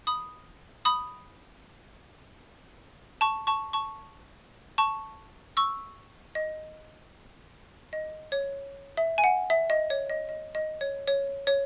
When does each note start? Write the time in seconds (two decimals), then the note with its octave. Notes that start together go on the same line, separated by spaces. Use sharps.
0.07 B5 D#6
0.85 B5 D#6
3.21 A5 C#6
3.47 A5 C#6
3.73 A5 C#6
4.78 A5 C#6
5.57 C#6 E6
6.35 D#5
7.93 D#5
8.32 C#5
8.97 E5
9.18 G#5
9.24 F#5
9.50 E5
9.70 D#5
9.90 C#5
10.10 D#5
10.29 D#5
10.55 D#5
10.81 C#5
11.07 C#5
11.47 C#5